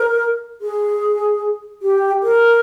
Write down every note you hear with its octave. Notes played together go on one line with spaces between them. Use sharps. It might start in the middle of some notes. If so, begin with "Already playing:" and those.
Already playing: A#4
G#4
G4
A#4